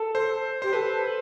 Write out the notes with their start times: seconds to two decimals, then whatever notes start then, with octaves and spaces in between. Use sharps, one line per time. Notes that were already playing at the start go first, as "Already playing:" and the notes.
Already playing: A4
0.15 C5
0.62 G4 C5
0.73 A4 B4
0.91 A4
1.04 B4